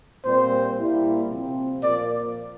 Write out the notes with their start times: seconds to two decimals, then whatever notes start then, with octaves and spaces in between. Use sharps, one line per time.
0.25 A#2 G3 C4 C5
0.78 A#2 G3 A#3 E4
1.30 C3 F3 C4
1.82 A#2 F3 A#3 D5